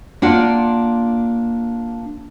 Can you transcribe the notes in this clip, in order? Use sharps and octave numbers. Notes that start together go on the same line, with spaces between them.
A#3 D4 F4 F#5